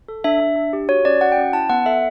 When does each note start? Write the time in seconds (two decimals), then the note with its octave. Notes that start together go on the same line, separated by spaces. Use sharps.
0.08 A4
0.24 D4 E5
0.40 D4
0.56 D4
0.73 G4
0.89 F#4 C#5
1.05 C#4 D5
1.21 F#4 F#5
1.32 G5
1.38 C#4
1.53 E4 A5
1.69 B3 F#5
1.86 A4 E5